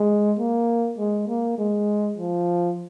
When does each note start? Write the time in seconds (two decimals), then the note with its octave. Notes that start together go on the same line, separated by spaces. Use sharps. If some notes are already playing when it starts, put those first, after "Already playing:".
Already playing: G#3
0.39 A#3
0.98 G#3
1.28 A#3
1.58 G#3
2.17 F3